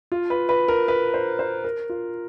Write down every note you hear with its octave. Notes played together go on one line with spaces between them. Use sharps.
F4
B4
B4
A#4
B4
C5
C5
A#4
F4